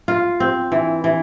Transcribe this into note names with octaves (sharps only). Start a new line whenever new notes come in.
F4
C4
E3
E3